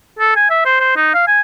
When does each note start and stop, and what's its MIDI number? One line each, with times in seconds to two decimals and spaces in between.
0.19 0.33 69
0.36 0.47 80
0.50 0.64 76
0.66 0.78 72
0.80 0.94 72
0.97 1.12 63
1.14 1.25 77
1.27 1.41 80